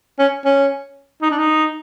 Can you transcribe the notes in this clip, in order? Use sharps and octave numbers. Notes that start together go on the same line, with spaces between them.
C#4
C#4
D#4
D4
D#4